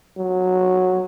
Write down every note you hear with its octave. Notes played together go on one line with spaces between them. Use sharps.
F#3